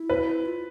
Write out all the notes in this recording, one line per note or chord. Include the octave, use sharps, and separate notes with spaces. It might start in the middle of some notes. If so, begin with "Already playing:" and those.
Already playing: E4
B4
F4